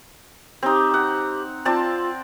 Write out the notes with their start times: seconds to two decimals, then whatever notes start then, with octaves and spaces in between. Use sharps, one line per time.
0.63 C4 D#4 G4
0.94 F#5
1.65 C4 F4 D5 A5